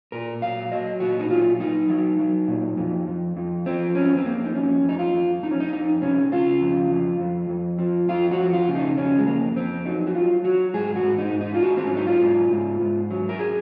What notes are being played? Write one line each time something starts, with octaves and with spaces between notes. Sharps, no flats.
A#2 A#4
F#3 F5
F#3 D#5
A#2 F#4
D#4
F#3 F4
F#3 D#4
F#3
F#3
A#2
F2
F2
F2
F3 C4
F2 C#4
C4
F2 A#3
D#4
F2 C#4
F2
D#4
F4
F2
F2 D#4
C#4
D#4
F2 D#4
C3 C#4
C#3 F4
F2
F2
F2
F2
F3
F2 F4
F#4
F2
F4
C#3
D#4
F2 C#4
G#3
F2 A#3
F2 C4
F#3 D#4
F#4
F#3 F4
F#3 F#4
G#2 G#4
F#4
G#2
D#4
G#2
D#4
F4
G#2 F#4
C4
C#4
F#3 D#4
F4
G#2
G#2
G#2
F#3
A#4
G#4